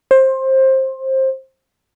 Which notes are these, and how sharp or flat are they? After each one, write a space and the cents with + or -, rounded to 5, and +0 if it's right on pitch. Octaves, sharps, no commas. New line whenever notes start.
C5 +20